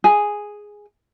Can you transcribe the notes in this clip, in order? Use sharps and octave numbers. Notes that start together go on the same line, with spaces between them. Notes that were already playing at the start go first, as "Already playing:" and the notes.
G#4